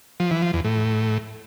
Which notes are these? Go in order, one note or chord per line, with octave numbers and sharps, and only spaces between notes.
F3
E3
F3
E2
A2